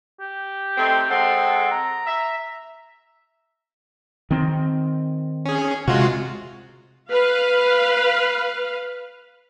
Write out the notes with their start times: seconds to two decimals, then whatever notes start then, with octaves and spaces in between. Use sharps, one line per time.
0.20 G4
0.77 A3 C4 D#4
1.10 G#3 C4 A4 F#5
1.71 A#5
2.05 E5
4.31 D#3 C4
5.46 C#4 G#4
5.88 C3 G#3 F4 F#4
7.10 B4 F5